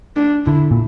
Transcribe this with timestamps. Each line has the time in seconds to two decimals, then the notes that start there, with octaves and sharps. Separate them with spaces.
0.17 D4
0.46 D3 E4
0.71 A#2